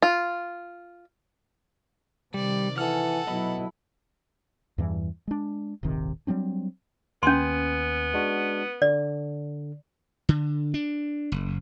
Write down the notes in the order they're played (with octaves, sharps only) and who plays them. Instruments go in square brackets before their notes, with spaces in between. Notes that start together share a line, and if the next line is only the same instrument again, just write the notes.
[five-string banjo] F4
[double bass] C3 D#3 [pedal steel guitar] G3 [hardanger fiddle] D5
[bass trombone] E3 [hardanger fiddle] A4 F#5 [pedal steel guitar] G#5 F6
[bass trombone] B2 [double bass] F#3 E4 [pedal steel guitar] D#5 B5
[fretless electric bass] E2 G2 E3
G#3 D4
D#1 G#1 C3 D#3
F#3 G3 C4 D4
[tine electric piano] D#2 G#5 [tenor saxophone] B3 [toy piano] C#4 C6
[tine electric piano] G#3 D4 F#4
[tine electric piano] D3 [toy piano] D5
[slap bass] D3
D4
F#1